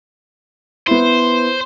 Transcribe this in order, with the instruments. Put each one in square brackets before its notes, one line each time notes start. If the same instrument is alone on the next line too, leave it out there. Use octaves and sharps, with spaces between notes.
[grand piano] B3 E4 [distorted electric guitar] C5